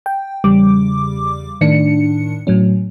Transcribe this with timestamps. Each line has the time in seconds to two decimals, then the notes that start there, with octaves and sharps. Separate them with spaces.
0.06 G5
0.44 E2 C#3 G3 D6
1.61 A2 D#3 D4 C#7
2.47 A2 F#3 C#4